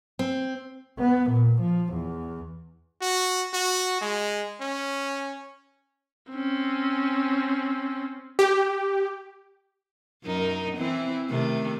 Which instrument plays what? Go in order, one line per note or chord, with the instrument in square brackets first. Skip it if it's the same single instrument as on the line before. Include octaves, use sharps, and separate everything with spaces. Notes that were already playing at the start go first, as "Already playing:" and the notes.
[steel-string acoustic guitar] C4
[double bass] B3
A#2
F3
E2
[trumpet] F#4
F#4
G#3
C#4
[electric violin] C4 C#4
[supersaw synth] G4
[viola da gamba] F#2 D#4 A#4
E3 C4 E4
C3 D#3 A3